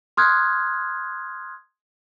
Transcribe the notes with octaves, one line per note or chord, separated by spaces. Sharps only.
C6 D#6 F6 F#6 G#6